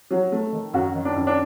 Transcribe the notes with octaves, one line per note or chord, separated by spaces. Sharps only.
F#3
A3
D#3
F#2 F#4
D#3
D4
F#2
D4